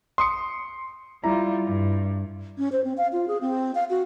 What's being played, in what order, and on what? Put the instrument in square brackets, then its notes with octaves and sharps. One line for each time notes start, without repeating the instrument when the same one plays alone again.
[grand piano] C6 D#6 C#7
[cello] G3 F4 [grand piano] E4 A#5
[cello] G2
[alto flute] C#4
C5
C4
F5
F4
G#4
C4
F5
F#4